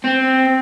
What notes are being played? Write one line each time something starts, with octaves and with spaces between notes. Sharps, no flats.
C4